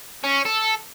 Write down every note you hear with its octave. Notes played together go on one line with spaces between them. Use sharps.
C#4
A4